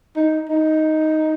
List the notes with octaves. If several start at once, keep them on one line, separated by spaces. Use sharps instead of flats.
D#4
D#4